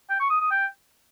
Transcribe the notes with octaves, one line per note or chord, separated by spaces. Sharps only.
G5
C#6
D#6
D#6
G5